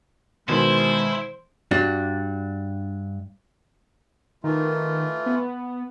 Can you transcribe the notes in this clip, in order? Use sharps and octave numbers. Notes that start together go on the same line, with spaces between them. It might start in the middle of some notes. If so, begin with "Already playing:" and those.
B2 D#3 E3 G#3 E4 C5
G2 D4 F#4
D#3 E3 A3 F4
B3